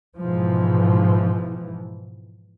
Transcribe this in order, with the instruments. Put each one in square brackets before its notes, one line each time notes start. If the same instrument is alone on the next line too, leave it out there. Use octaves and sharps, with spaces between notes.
[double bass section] G#2 B2 E3 F3